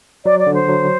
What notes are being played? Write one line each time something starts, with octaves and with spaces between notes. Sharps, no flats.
F#3 D5
D5
D3
C5
F#3